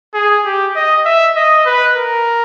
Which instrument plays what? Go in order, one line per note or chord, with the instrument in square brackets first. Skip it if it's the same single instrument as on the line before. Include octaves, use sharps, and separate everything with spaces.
[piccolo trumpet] G#4
G4
D#5
E5
D#5
B4
A#4